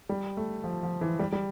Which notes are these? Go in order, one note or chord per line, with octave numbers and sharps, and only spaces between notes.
G3
A3
F3
F3
E3
G3
G3